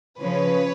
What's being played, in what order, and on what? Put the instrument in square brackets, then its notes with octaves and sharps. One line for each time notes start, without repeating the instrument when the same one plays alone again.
[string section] C#3 F3 B4 C#5